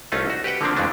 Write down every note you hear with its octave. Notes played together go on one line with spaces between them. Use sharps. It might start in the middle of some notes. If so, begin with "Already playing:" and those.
C2 A3 C#4 D#4 F4
F#4
G4 B4 F#5 G5
D3 F3 A#3 C4 D4
F2 E3 G#3 A3 D4